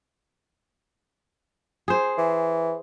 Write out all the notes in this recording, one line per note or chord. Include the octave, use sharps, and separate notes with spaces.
G#4 C5
E3